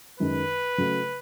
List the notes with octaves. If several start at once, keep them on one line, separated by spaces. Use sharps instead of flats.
F#2 D#3 G#3 D#4 B4
C#3 F#3 A3